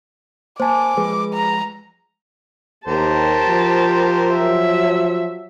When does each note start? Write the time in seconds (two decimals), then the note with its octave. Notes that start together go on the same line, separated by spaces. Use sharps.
0.60 A#3 C5 G#5 A5 D6
0.97 F3 G#3 G#4 B4
1.34 A#5
2.87 D#2 G4 A#4 C5 A5
3.49 F3
4.33 F#3 E5